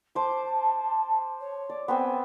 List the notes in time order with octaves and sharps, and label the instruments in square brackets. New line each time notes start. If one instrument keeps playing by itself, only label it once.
[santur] C5 D6 [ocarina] A5
[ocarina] C#5
[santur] D5
[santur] B3 C4 C5 [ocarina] G#5